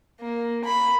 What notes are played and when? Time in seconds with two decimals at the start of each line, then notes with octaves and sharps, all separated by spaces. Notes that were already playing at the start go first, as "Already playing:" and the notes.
0.21 A#3
0.65 B5